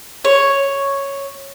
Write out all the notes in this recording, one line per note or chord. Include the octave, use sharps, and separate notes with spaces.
C#5